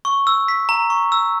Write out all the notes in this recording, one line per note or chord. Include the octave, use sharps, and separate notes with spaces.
C#6
E6
B6
A#5
C#6
E6